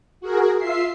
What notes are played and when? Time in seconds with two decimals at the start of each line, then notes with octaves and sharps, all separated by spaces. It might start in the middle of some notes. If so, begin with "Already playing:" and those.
0.21 F#4 G#4 A#4
0.58 F4 E5 C7